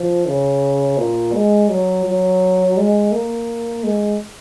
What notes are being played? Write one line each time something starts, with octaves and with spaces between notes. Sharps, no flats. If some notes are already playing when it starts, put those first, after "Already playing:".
Already playing: F3
C#3
A#2
G#3
F#3
F#3
G#3
A#3
G#3